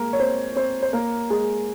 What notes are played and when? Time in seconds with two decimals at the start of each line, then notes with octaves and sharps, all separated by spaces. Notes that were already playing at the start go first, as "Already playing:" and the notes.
Already playing: G#3 A#3 A#4
0.13 C#5
0.19 C4 C5
0.55 C4 C5
0.82 C5
0.93 A#3 A#4
1.30 G#3 G#4